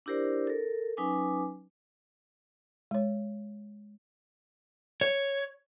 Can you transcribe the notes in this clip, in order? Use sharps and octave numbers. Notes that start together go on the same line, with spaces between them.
D4 E4 G4 A#4 C5 D5
A4 A#4
F#3 C#4 D#4 B4 G#5 D6
G#3 C#5
C#5